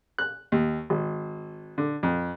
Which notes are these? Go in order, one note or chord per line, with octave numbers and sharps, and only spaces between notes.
F#6
D#2
G#1
D3
F2